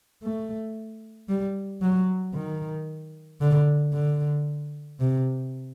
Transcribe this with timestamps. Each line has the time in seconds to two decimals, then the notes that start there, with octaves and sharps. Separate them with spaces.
0.23 A3
1.28 G3
1.82 F#3
2.35 D#3
3.41 D3
3.94 D3
5.00 C3